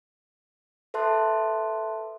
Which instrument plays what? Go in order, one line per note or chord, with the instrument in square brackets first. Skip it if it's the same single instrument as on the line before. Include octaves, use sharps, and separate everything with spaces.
[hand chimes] A4 B4 E5 A5 C6 F#6